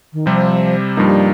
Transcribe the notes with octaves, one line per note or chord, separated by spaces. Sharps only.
D#3
C3 F3 G3 C4
G2 F3 G3 A#3 D#4